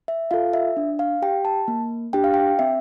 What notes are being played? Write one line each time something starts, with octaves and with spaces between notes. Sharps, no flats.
E5
F4 A4 F5
E5
D4
F5
G4 G5
A5
A#3
D4 G4 G5
F5
G5
C4 E5